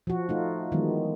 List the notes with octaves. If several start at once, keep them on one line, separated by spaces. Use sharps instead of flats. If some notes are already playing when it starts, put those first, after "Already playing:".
F3 F#4
A3 D#4 F4
D#3 E3 F#3 G#3 B3